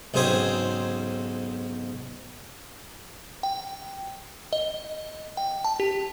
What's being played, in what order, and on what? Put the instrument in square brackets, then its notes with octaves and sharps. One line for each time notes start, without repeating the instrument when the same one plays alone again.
[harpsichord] B1 G#2 C#3 C4 G#4
[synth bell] G5
D#5
G5
A5
G4